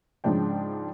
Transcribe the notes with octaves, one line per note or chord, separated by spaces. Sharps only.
G#2 C#3 F3 D4 G5